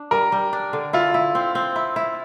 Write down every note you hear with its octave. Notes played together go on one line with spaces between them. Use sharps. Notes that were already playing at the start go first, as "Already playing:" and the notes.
Already playing: D4
G3 A#4
G3
D4
D3
E4 F4
E4
C4
C4
E4
E4